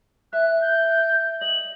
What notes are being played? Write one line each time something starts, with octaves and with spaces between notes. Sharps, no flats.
E5 F#6
G6
D#5 F#7